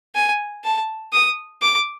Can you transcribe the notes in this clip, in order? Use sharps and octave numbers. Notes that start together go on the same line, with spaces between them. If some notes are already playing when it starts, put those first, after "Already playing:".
G#5
A5
D#6
D6